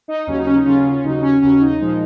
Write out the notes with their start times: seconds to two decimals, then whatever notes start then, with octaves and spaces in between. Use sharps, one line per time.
0.08 D#4
0.27 D#2 C#3 F#3 C#4
0.37 D#4
0.46 C#4
0.56 D#4
0.65 D#2 C#3 F#3 C#4 F4
1.03 D#2 C#3 F#3 D#4
1.22 C#4
1.41 D#2 C#3 F#3 C#4
1.61 D#4
1.80 A#2 F3 G#3